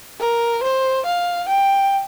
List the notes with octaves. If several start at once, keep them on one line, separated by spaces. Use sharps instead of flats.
A#4
C5
F5
G5